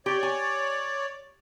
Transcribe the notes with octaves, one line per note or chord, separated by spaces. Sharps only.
G4 C#5 D5
G#5